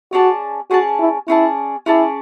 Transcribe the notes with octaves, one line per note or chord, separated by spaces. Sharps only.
C#4 F#4 G#4 D5 A5
C#4 F#4 G#4 D5 A5
E4
C#4 E4 G#4 D5 A5
C#4 E4 G#4 D5 A5